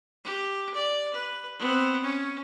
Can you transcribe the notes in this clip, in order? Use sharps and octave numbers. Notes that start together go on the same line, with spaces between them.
G4
D5
B4
B3 C4
C#4